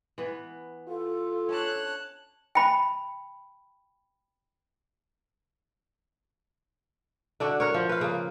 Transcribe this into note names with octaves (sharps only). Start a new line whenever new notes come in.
E3 B3
F4 A4
C#4 D4 C#5 A5 F#6
G5 B5
D3 D4 F#4
A#4 C#5
F3
B4 F5
C#3 A#3